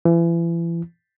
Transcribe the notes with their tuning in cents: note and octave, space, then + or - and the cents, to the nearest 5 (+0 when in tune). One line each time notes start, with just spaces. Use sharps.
E3 +35